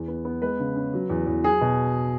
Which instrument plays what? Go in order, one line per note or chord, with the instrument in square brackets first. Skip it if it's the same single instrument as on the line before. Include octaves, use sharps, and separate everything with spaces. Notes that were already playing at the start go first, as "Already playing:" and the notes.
Already playing: [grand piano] E2
B3
B3
G#3 B4
C#3
C#4
F#3
E2
E2
F#3 G#4
B2